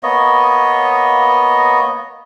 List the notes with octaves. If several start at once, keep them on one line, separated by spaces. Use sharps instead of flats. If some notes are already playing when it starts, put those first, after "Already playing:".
A#3 B3 C#5 D#5